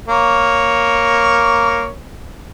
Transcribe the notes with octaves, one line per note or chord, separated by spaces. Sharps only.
A#3 C#5